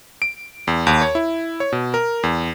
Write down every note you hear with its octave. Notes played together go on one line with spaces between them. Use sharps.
D7
E2
D#2
C#5
E4
C#5
B2
A#4
E2